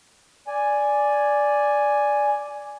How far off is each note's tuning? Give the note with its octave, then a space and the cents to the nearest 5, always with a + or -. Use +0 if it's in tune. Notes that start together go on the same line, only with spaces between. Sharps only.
D5 -5 G#5 +0